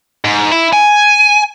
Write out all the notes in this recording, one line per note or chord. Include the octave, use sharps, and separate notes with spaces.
G#2
E4
G#5